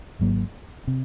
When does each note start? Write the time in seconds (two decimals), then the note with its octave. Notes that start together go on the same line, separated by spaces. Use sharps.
0.19 G#1 G#2 F#3 A#3
0.87 C3